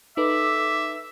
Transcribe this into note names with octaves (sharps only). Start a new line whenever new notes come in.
D#4 A4 B4 E5 D6